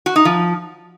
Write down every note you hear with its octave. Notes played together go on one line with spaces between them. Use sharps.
F#4
D#4
F3